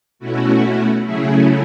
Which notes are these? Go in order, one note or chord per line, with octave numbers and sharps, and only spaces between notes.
B2 A3 C#4 E4 F#4
C#3 F#3 A3 C#4 E4 G#4